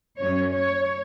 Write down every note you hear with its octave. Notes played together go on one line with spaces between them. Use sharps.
F#2 F#3 C#4 C#5
C#5